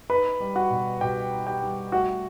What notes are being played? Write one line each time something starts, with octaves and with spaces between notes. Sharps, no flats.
D#4 B4 B5
G3
F#4 F#5
B2
B2 G4 G5
D#4
G4 G5
G3
A3 F#4 F#5